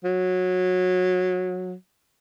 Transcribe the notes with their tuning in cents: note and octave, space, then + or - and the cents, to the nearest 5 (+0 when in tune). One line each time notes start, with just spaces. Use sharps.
F#3 -20